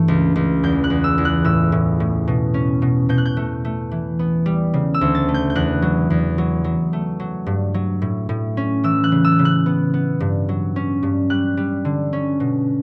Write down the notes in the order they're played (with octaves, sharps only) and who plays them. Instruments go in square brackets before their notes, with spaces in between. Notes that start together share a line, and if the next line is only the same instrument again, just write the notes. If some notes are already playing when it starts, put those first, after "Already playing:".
Already playing: [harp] G2 E3 A3
C#2
C#2
E2 G6
F#6
E2
E6
E2
F#6
A2 E6
A2
A2
B2
C#4
B2
B2 G6
F#6
G6
A3
A3
E3
B3
G3
C#3
E6
D2
A6
A3
G6
G6
E2 F#6
F#3
E2
F#3
F#3
A3
F#3
G2
F#3
A2
A2
C#4
E3 E6
F#6
C#3
E6
C#3
F#6
B3
B3
G2
F#3
C#4
G2
G3 F#6
G3
D3
C#4
B2